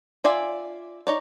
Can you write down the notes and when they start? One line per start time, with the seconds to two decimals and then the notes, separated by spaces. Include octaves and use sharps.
0.24 F4 D5 E5 G#5
1.07 D#4 C#5 D5